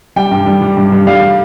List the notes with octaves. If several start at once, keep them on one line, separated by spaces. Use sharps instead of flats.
G3 G5
G2
G3
G3
G2
G2
G3 F5